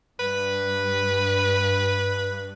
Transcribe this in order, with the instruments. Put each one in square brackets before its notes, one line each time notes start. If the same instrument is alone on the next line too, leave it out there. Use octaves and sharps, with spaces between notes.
[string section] G2 [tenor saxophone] B4